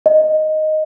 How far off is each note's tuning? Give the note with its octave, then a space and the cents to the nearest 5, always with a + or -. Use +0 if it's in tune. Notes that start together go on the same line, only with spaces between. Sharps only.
D#5 +0